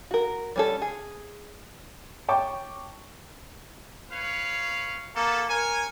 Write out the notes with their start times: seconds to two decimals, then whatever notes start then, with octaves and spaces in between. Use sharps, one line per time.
0.11 F#4 A#4
0.56 G3 C#4 A4
0.82 G#4
2.28 C#5 G5 A5 C#6 D6
4.12 B4 C#5 F5
5.16 A#3 B3 A4
5.49 A#4 C#5 G#5